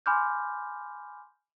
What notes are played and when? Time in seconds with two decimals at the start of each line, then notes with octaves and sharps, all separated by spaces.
0.06 G#5 B5 C6 D6 F6 G6